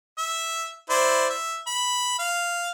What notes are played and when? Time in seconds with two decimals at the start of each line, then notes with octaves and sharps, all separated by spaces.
0.18 E5
0.89 E4 C5 D5
1.30 E5
1.67 B5
2.19 F5